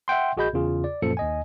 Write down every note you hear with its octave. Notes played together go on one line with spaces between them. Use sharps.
E5 F#5 G5 C6
A#1 F#4 G#4 D#5 B5 G6
E2 C#3 F4 G#4
D5
F#2 A#2 F3 A#3 A4 C#7
D#2 D#5 G#5